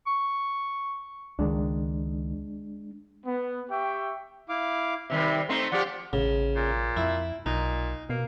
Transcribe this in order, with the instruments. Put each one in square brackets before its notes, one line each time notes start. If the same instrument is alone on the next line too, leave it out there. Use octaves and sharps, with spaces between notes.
[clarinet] C#6
[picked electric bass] C#2 D#3 [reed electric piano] G#3 D4
[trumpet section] B3
G4 E5 G5 C#6
[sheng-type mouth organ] E4 F5 D6
[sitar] C3 D#3 G3 [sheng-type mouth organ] E5
[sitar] A3 C4 D#4 [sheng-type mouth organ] C6
[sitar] F3 G4 [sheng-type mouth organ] D5 F#5
[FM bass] A1 [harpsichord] C#3
[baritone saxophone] A#2
[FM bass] F2 [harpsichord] E4
[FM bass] B1 [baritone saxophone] A#2 [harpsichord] D#4
[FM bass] B2 [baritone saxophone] A#3